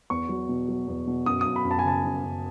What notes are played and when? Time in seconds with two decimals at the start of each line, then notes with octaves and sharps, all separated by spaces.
0.10 E2 C#6
0.29 F#3
0.49 B2
0.69 F#3
0.88 E2
1.07 B2
1.26 F#2 D#6
1.41 D#6
1.46 F#2
1.56 B5
1.65 F#2
1.71 A5
1.79 G#5
1.85 C#3 A5
2.04 F#2
2.23 F#2